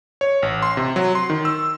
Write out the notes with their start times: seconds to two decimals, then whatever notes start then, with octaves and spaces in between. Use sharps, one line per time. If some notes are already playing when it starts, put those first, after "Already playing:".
0.21 C#5
0.42 A1
0.62 C6
0.77 C3
0.96 F#3
1.15 C6
1.30 D#3
1.45 E6